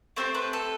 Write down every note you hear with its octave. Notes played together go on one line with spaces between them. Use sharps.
A3 C4 G4 C5
B4
A4